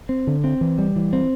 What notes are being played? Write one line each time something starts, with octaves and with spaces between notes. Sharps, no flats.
C4
D3
C4
E3
G3
E3
C4